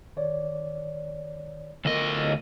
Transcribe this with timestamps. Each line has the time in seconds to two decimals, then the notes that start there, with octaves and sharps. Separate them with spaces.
0.16 D#3 C#5 D5
1.85 D2 B3 F4 A#4 D#5